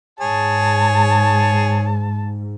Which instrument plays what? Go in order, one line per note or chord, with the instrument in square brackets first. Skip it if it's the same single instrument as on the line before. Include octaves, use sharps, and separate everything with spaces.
[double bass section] G#2 [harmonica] G#4 C#5 [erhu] A5